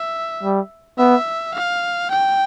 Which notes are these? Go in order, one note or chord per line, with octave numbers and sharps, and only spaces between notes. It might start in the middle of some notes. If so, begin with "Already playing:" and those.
Already playing: E5
G3
B3 E5
F5
G5